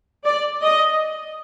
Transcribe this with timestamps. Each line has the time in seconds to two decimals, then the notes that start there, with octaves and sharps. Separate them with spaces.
0.24 D5
0.63 D#5